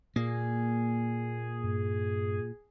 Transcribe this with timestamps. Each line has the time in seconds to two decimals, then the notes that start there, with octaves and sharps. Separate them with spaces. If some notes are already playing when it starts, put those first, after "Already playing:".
0.16 A#2 A#3 G#4
1.64 G2